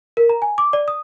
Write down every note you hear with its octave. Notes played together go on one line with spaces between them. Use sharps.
A#4
A#5
G#5
D6
D5
D#6